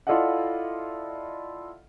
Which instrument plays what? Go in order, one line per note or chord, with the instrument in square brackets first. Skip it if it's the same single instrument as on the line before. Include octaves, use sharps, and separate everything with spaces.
[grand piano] E4 F4 A4 D5 D#5 F#5